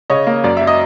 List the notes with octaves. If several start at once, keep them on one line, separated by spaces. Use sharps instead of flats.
C#3 C#5 D#5
A#3
F#2 D5
F#3 E5
D#5